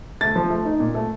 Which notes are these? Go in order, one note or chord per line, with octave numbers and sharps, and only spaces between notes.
A3 A6
F3
A3
D#4
A#2
A3